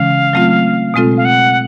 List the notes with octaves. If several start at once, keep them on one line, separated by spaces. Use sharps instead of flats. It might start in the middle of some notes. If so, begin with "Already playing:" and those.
Already playing: C#3 E3 G#3 C#4 F5
F#3 A3 C4 F4
B2 G#3 C4 F4 A4
F5
F#5